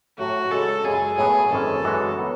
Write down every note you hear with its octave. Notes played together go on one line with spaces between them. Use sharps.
A2 F#3 A3 F#4
C#3 G#3 D4 A4
F#2 C#3 G#3 C#4 G#4
A2 F#3 B3 F#4 G#4
G#1 F#2 E3 G#3 C#4 A4
F#2 E3 G#3 D4 F#4
F#3 B3